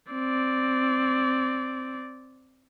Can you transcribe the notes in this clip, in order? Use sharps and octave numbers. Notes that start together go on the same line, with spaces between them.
C4 D5